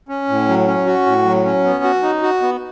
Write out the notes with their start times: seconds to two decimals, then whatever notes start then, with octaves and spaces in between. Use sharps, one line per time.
0.09 C#4
0.29 A2
0.48 F#3
0.68 C#4
0.86 F#4
1.06 A2
1.25 F#3
1.45 C#4
1.64 B3
1.84 F#4
2.03 D#4
2.23 F#4
2.42 B3